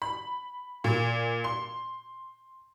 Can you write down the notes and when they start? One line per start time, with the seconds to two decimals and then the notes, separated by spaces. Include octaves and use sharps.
0.02 B5
0.84 A#2
1.44 C6